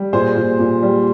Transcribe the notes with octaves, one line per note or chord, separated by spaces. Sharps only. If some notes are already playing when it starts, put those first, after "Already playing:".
Already playing: G3
A#2 G#4 C5
A#2
A#2
G3